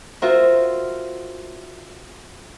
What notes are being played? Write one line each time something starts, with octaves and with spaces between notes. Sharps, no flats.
F4 F#4 A#4 C5 E5